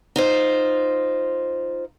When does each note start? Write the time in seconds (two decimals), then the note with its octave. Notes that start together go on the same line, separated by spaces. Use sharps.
0.16 D#4 F4 C5